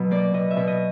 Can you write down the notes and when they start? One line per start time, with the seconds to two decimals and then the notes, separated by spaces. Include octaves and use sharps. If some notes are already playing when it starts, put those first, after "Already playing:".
Already playing: B2 F#3
0.11 A#3 D5
0.34 B2 D#5
0.51 E5
0.57 B2
0.67 D#5